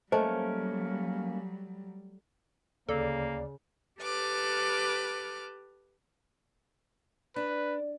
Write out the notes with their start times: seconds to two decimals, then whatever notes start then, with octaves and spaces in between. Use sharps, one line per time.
0.12 F#3 G3 A3 A#3 C#4 A#4 C5 D#5
2.89 D2 C#3 A#3 A4 D5
4.00 G4 A4 B4 D6 F6
7.36 D4 B4